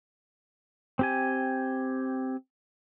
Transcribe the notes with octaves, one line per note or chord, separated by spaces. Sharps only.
C4 G4 G#5